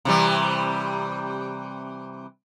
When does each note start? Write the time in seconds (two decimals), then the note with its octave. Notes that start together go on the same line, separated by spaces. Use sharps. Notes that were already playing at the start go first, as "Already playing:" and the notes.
0.05 C3 E3 G3